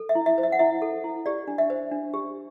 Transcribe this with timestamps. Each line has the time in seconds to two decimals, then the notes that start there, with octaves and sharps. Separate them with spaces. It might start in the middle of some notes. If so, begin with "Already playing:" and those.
Already playing: A4
0.09 E5
0.15 E4
0.26 E5
0.38 C5
0.43 E5
0.52 F#5
0.59 E4 E5
0.82 A4
1.04 E4
1.26 G4 D5
1.48 D4
1.58 E5
1.70 C5
1.92 D4
2.14 G4